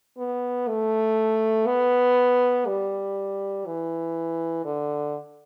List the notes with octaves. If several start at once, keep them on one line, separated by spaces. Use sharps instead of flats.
B3
A3
B3
G3
E3
D3